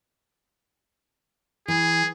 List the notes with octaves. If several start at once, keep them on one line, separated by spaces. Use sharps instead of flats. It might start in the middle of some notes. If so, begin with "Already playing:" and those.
E3 G#4